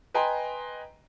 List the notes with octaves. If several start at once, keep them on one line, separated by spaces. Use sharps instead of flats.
B4 D#5 G5 G#5 A#5 C6